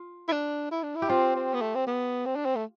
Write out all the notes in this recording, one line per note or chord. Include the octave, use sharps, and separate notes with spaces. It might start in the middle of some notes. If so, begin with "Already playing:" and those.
Already playing: F4
E4
D4
E4
D4
E4
G4
C4 F4
C4
B3
A3
C4
B3
C4
D4
C4
A3